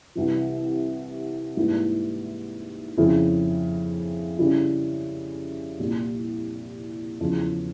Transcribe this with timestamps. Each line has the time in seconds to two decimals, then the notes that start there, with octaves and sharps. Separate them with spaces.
0.15 C2 C3 E3
1.56 G#2 E3 G3 A#3 E4
2.97 F2 C#3 F3 C4 E4
4.39 C#3 G3 C#4 E4
5.79 C2 A#2 G3
7.20 E2 C#3 F3